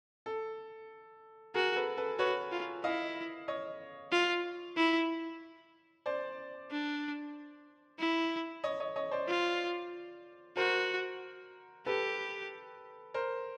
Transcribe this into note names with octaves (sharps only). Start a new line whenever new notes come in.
A4
F#4 G#4 A#4
A4 B4
A4 B4
F#4 B4 C#5
F4
E4 D#5 F5
C#5 D#5
F4
E4
C5 D5
D4
E4
C#5 D#5
C#5 D#5
C#5 D#5
C5 D5
F4
F#4 A#4 C5
G4 A4 B4
A#4 C5